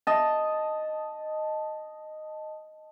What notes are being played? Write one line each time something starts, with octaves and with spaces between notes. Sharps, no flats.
D#5 A5